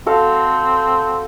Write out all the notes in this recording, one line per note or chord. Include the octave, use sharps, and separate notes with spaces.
C4 F#4 A4 F5